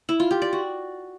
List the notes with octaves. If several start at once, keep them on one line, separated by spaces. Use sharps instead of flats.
E4
F4
G4
D5
F#4